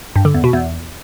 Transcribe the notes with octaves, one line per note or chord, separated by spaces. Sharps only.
G2
D3
E2
B2
E2